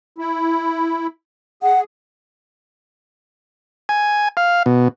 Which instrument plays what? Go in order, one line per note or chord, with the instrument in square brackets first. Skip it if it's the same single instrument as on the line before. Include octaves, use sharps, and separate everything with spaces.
[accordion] E4
[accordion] G#4 [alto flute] F#5
[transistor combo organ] G#5
F5
B2